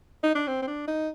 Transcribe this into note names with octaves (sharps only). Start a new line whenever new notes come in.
D#4
D4
C4
C4
D4
D#4